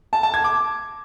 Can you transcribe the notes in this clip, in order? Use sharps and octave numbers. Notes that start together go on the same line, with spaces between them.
A5
A5
G#6
D6